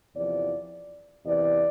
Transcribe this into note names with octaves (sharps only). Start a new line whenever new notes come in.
E2 C3 F3 D5
E2 C3 E3 D5